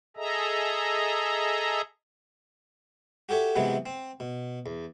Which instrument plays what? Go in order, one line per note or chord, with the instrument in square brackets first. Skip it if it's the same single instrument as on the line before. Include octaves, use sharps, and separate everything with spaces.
[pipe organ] G#4 A4 D#5 E5 A#5
[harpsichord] F#4 G4 A4 C#5 E5
C3 E3 F#3 G#3 B3
C4
B2
E2